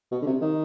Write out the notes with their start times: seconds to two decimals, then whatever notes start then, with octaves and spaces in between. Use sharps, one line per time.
0.12 B2
0.22 D3
0.26 C3
0.41 D#3